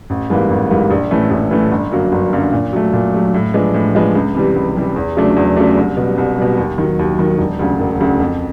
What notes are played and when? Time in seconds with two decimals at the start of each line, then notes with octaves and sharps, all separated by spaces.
0.10 A1
0.30 G#2 E3 G3 A#3
0.50 A1
0.70 G#2 E3 G3 A#3
0.91 A#1
1.11 A2 E3 A3 C#4
1.31 A#1
1.51 A2 E3 A3 C#4
1.72 G1
1.91 F#2 D3 F#3 A#3
2.12 G1
2.33 F#2 D3 F#3 A#3
2.52 A#2
2.73 F#3 A3
2.93 A#2
3.14 F#3 A3
3.34 A2
3.54 F3 G#3 B3 D4
3.74 A2
3.95 F3 G#3 B3 D4
4.15 C#2
4.35 C3 E3 G3
4.56 C#2
4.76 C3 E3 G3
4.96 E2
5.17 C#3 F#3 A3 D4
5.36 E2
5.56 C#3 F#3 A3 D4
5.77 C2
5.97 B2 G3
6.18 C2
6.38 B2 G3
6.58 D#2
6.78 D#3 F#3
6.99 D#2
7.19 D#3 F#3
7.39 E1
7.59 D2 C#3
7.80 E1
8.00 D2 C#3
8.20 F2